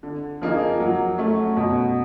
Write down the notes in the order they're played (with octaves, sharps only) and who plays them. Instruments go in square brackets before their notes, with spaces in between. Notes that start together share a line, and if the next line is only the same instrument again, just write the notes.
[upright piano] D3
F3 A#3 D#4 G#4
F#3
A3 C#4
B2